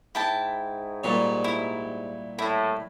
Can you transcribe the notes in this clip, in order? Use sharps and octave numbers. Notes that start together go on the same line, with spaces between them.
G#2 E4 G5 A5
A#2 G3 C#5
E4
A2 E4